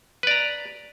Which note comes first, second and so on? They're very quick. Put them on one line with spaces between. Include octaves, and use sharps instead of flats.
B4 D5 A#5